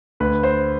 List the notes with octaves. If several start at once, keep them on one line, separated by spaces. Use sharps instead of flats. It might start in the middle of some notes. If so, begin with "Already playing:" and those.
D2 B4
C5